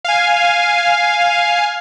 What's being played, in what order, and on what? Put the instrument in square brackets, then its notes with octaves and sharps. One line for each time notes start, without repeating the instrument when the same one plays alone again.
[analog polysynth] F5 G#5